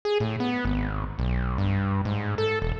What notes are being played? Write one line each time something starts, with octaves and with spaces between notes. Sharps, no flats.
G#4
A2
B3
G#1
B1
G2
G#2
A4
E1